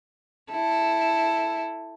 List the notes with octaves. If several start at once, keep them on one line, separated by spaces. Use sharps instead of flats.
E4 A4